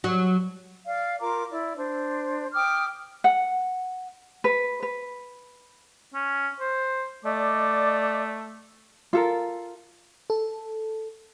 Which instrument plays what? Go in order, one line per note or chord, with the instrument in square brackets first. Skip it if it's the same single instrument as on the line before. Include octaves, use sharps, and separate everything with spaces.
[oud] F#3
[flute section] D5 F5
F4 A#4 A#5 D6
E4 D5
D4 C5
G5 D6 D#6 F6
[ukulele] F#5
B4
B4
[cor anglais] C#4
C5
[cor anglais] A3 [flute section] D5 D#5 D6
[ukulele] F4 A4 A#4
[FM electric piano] A4